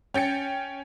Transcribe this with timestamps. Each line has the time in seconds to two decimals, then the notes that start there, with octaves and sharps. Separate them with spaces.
0.14 C#4 G5 A6 C#7